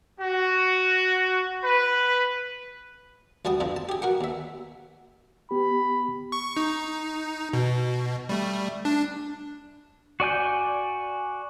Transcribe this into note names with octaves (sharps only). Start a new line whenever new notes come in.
F#4
B4
D2 G3 F#4 A5 D#6
F2 D3 F3
A5
G4 G#4
F#4 A#4 F#5
D#2 E5
B3 G4 B5
C#6
D#4
B2
G3 A3
D4
F#4 D5 G#5 G6